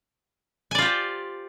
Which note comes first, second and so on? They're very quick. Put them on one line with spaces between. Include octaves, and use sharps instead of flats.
G#5 D5 F4 G4 C5